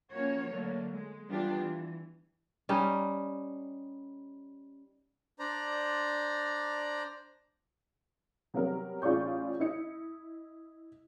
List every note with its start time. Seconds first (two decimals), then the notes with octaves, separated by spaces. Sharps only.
0.11 F3 A#3 C#4 F#4 C#5
0.51 D3 F#3 A3 A#3
0.91 G#3
1.27 E3 G3 B3 D4 F4 G4
1.58 E3
2.69 G3 C#4 D#4
5.39 D4 C5 D5 A#5
8.54 C3 F#3 G3 B3 F#4 A#4
9.02 A1 F4 G#4 D5 C#6 G6
9.60 E4 D#5 C#7